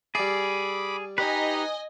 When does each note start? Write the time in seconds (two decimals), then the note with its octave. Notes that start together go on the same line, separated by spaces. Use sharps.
0.15 G3 G#4 D5 B5 D6
1.18 D#4 G4 B4 D#5 G#5 A#5